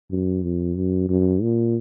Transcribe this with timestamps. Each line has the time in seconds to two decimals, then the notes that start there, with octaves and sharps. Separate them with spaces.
0.11 F#2
0.43 F2
0.76 F#2
1.09 F#2
1.42 A#2